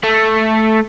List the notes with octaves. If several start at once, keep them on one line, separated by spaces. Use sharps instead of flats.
A3